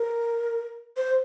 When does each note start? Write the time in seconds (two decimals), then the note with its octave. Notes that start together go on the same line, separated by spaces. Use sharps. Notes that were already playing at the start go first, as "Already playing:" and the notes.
Already playing: A#4
0.97 C5